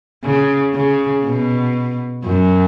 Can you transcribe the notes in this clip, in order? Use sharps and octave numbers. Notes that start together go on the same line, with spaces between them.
C#3
C#3
B2
F#2